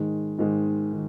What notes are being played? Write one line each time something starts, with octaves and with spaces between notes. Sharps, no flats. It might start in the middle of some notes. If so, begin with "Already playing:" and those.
Already playing: G#2 D#3 G#3
G#2 D#3 G#3
D#3